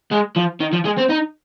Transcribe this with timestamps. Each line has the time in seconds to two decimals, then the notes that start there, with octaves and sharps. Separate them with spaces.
0.11 G#3
0.36 F3
0.60 D#3
0.73 F3
0.85 G#3
0.98 C4
1.10 D#4